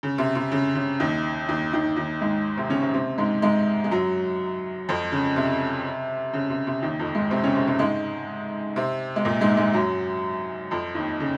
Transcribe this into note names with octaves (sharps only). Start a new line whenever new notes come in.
C#3
C3
C3
C#3
C#3
D#2 D#3
D#2 D#3
D#2 D#3
D#2 D#3
G#2 G#3
C3 C4
C#3 C#4
C3 C4
C3 C4
G#2 G#3
G#2 G#3
G#3
F#2 F#3
F2 F3
C#3
C3
C#3
C3
C3
D#2 D#3
F2 F3
G#2 G#3
C3 C4
C#3 C#4
C3 C4
C3 C4
G#2 G#3
C3 C4
G#3
A#2 A#3
G#2 G#3
G#2 G#3
F#2 F#3
F2 F3
D#2 D#3
C#3